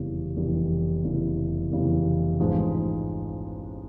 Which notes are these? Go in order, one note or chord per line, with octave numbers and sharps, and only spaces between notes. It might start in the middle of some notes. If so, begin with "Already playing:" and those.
Already playing: F1 E2 C#3 E3 G3
F1 E2 C#3 E3 G3
F1 E2 C#3 E3 G3
F1 E2 C#3 E3 G3
A1 G#2 F3 G#3 B3